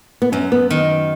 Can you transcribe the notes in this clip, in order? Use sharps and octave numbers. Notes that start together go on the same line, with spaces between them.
B3
F#2 C#4
B3
D#3